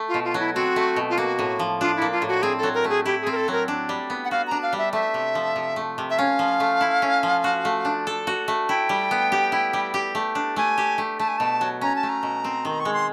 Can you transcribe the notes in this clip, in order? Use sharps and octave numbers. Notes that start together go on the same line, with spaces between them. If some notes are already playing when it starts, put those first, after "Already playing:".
Already playing: A3
F4
B2
F4
F#3
E4
C4 F#4
A3
B2
F4
A#3 F#4
A2
F3
D4 F4
E4
A#3
F4
A2
F#4
C4 G#4
A4
F#3
A#4
A3
G#4
E4 G4
C4 G#4
A#4
A4
F#3 A#4
D4
G3
B3
F#5
F#4 F5
D4 A#5
F5
G3
E5
A3 E5
C3
F3
C3
A3
C3
E5
C#4 F5
F3
A3
E4
C#4
F3
F#4
A3
D4
A4
F#4
A3
E4 G5
G3
B3
G4
E4
G3
G4
A3
D4
A3 G#5
G4
A3
A3 A5
G#5
B2 A5
F#3
C#4 A#5
A5
A3
A#5
B2
C4
D#3
C#6
G#3
C6